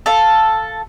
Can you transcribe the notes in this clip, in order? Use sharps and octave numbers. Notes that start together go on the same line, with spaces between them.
A4 F5